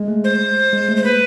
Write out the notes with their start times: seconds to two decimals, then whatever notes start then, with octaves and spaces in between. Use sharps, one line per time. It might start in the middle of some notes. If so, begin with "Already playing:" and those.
Already playing: G#3
0.08 A3
0.24 C5
0.73 G#3
0.89 A3
0.97 C5
1.04 A#3 B4